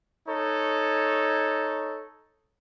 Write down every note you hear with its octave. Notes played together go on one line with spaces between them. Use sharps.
D#4 A4 C#5